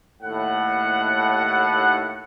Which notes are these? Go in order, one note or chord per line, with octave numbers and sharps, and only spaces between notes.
D#2 A2 F#5